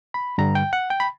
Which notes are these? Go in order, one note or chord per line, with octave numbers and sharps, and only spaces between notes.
B5
G2 D3 G3 A#5
G5
F#5
G5
B5